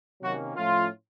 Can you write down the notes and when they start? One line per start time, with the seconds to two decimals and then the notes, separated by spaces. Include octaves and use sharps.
0.22 C3 D#3 F#3 A#3 C#4 F#4
0.56 A2 F3 A3 C#4 F4